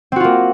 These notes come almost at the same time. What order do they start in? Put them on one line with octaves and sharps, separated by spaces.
C4 F#4 F4 A#3